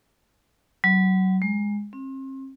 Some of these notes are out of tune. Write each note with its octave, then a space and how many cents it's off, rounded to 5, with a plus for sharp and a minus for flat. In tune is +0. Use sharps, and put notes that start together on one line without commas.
F#3 +25
G#3 -10
C4 +40